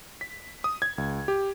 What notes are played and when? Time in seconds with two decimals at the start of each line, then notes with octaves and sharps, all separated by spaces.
0.21 B6
0.64 D#6
0.82 G#6
0.98 C#2
1.28 G4